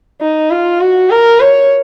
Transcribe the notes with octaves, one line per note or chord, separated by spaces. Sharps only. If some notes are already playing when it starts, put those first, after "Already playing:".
D#4
F4
F#4
A#4
C#5